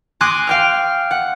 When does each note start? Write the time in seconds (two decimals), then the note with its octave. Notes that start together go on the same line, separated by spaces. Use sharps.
0.21 G#5 C6 D6 D#6 F#6 A#6
0.47 F5 G5 F6
1.11 F#5